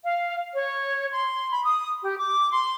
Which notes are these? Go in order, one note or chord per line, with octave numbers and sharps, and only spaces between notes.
F5
C#5
C6
B5
D#6
G4
D6
C6